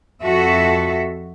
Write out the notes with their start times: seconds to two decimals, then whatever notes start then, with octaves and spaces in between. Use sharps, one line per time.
0.22 F2 F#4 A4 E5